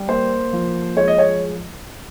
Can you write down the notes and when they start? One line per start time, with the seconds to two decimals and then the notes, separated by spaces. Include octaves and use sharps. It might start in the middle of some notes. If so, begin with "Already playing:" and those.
Already playing: G3
0.08 A#3 C5
0.53 F3
0.96 G#3 C#5
1.08 D#5
1.18 C#5